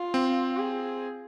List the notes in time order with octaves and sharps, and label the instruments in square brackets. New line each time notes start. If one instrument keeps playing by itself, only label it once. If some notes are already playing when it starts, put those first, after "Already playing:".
Already playing: [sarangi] F4
[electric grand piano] C4
[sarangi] G#4